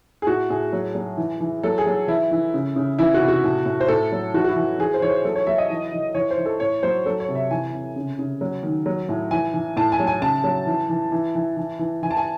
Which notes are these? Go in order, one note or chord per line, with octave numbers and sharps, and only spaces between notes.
G#4
A2 F#4
A2 G#4
F#3
F#3
E3
E3
F#3 A4
G#4
F#3
E3 E4
E3
C#3
C#3
E3 E4
F#4
C3
F#4
A2
A2
C5
A2 A4
F#3
E3 F#4
F#4
E4
E3
E3 G#4
C5
E3 C#5
C5
F#3 A4
C#5
F#3 E5
D#5
E3
E3
E3 C#5
C5
E3
A4
A2 C#5
F#3 C5
F#3 A4
C#5
C3
E5
E3 G#5
C3
C#3
C#3
F#3
D#3
F#3
A2
E3 G#5
E3
A2 A5
G#5
F#3
G#5
C#3 A5
F#3
E3
E3
E3
E3
E3
E3
E3 G#5
A5
G#5